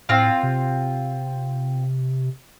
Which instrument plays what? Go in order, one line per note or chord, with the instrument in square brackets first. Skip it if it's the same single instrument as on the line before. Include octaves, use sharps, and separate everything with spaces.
[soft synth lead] A2 [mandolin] C4 F4 F5
[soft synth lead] C3